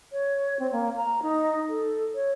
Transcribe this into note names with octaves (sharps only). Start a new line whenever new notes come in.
C#5
C4
A#3
A#5
D#4
A4
C#5